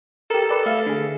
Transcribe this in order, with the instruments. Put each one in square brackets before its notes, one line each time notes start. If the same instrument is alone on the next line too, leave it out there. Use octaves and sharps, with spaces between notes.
[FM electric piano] G4 A#4 [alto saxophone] A4
[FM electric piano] B4 D5 A5
A3 E5 F5
D3 G#4